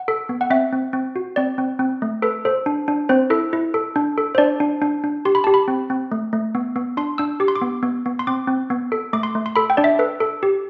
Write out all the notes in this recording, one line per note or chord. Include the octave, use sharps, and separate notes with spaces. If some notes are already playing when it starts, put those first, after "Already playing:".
Already playing: F#5
A4
B3
F#5
C4 E5
C4
C4
F#4
C4 D5
C4
C4
A3
A4 B4
A4 C5
D4
D4
C4 C5
E4 A4
E4
A4
D4
A4
C5
D4 D5
D4
D4
D4
G4 C6
B5
G4 A5
B5
C4
C4
A3
A3
B3
B3
D4 C6
D4 E6
G4 D6
C6
D6
B3
B3
B3
C6
C4 D6
C4
B3
A4
A3 D6
C6
A3
C6
A4 B5
G5
D4 D5
E5
A4 B4
A4
G4